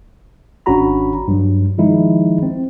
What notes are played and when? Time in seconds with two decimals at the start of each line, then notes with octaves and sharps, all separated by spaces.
0.66 G#1 C#4 D4 F#4 A#5 B5
1.28 G2 F#3
1.78 D#3 F3 G#3 D#4 E4
2.43 C4